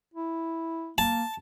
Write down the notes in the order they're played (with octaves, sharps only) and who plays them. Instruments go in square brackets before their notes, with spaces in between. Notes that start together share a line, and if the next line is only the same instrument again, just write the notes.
[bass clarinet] E4
[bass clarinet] A#3 [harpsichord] A5